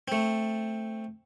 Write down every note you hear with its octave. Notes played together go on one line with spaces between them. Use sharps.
A3 C4